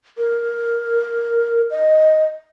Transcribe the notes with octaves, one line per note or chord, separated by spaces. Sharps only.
A#4
D#5